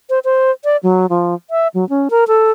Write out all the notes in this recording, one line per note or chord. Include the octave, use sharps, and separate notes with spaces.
C5
C5
D5
F#3
F3
E5
F#3
C#4
A#4
A4